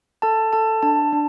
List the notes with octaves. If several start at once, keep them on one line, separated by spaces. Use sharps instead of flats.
A4 A5
A4 A5
D4 A5
D4